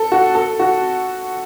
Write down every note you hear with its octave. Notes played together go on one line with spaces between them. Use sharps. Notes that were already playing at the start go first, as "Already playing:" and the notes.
Already playing: A4
F#4
A4
F#4